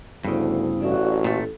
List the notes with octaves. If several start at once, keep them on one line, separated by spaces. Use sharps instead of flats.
D2 G2 C#3 B3 E4 C5
A1 F#4 D5 E5 F5
A#2 A3 A4